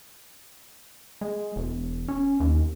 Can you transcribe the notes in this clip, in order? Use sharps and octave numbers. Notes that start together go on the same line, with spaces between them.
G#3
E1
C#4
D#2